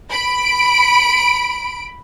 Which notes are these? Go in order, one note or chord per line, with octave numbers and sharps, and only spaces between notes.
B5 D7